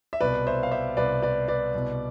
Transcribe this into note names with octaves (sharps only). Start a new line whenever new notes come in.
E5
C2 B2 B4 D5
C5 E5
F5
C5 E5
C2 B2 B4 D5
B4 D5
B4 D5
C2 B2